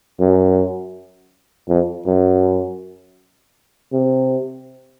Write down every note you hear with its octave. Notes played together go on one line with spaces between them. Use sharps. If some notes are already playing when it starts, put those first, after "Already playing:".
F#2
F2
F#2
C3